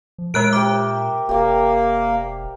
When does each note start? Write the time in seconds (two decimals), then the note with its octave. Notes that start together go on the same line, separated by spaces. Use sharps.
0.18 F3
0.34 A#2 G#3 A#4 E5 F#6 D7
0.53 G4 C5 D6
1.29 E1 A#3 G4 D5